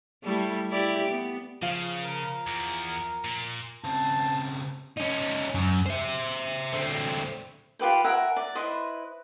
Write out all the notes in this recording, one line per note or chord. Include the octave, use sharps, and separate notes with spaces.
G3 A3 E4
E4 G4 D5
B3
C#3 F3 F5 D#7
A#4
E2
A#2
C#3 C4 A5
C#4 D#4
F#2
C5 E5
D3 C4
F4 G4 B4 G5
A#4 E5 F#5 G#5
D5
E4 B4 C5 D#5